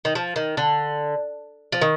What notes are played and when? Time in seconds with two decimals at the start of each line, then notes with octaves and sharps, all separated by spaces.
0.05 D#3
0.15 F3
0.36 D#3
0.57 D3
1.72 F3
1.82 D#3